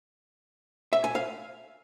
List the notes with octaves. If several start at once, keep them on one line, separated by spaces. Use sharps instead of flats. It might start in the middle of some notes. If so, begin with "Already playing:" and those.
E5
G#5
F5